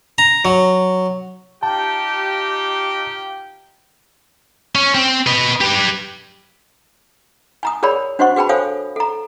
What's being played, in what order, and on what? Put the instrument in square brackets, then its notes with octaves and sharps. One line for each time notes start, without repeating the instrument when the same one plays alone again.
[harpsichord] A#5
F#3
[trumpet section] D#4 F4 G4 [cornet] G5 [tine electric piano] A5
[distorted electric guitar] C#4
C4
B4 D#5
G4 B4
[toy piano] G#5 A#5 D#6
G#4 A#4 C#5 D5 B5
D4 F#4 C5 D#5 F#5 C#6
F#4 G#4 B4 G5 A5 B5
A4 C5 C#5 F5 G#5 D#6
A4 A#5